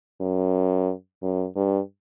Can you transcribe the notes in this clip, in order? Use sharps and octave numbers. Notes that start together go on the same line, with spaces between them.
F#2
F#2
G2